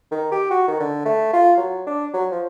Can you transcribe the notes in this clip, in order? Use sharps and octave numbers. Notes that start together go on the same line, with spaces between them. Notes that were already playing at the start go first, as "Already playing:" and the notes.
D#3
G4
F#4
D#3
D3
A3
F4
F#3
D4
F#3
F3